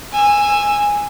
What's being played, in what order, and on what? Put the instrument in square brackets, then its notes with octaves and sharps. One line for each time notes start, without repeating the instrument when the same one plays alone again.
[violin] G#5 E6